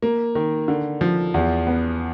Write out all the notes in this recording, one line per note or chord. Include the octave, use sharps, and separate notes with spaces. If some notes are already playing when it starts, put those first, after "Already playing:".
A#3
D#3
D3
F3
E2
B3